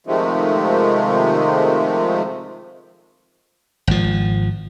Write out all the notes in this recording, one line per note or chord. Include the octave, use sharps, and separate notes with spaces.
C3 D#3 F3 G#3 A3
G#1 F3